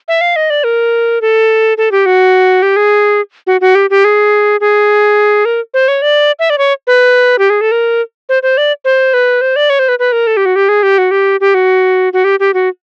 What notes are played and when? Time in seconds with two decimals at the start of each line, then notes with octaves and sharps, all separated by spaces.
0.08 E5
0.21 F5
0.36 D#5
0.50 D5
0.64 A#4
1.21 A4
1.78 A4
1.92 G4
2.06 F#4
2.62 G4
2.76 G#4
3.47 F#4
3.61 F#4
3.75 G4
3.90 G4
4.04 G#4
4.61 G#4
5.45 A#4
5.74 C5
5.88 C#5
6.02 D5
6.39 E5
6.50 D5
6.58 C#5
6.87 B4
7.39 G4
7.50 G#4
7.61 A4
7.72 A#4
8.29 C5
8.43 C5
8.58 D5
8.85 C5
9.14 B4
9.41 C5
9.56 D5
9.70 C#5
9.79 C5
9.89 B4
9.99 B4
10.12 A#4
10.27 A4
10.37 G4
10.46 F#4
10.56 G4
10.69 G#4
10.83 G4
10.98 F#4
11.11 G4
11.40 G4
11.54 F#4
12.13 F#4
12.24 G4
12.40 G4
12.54 F#4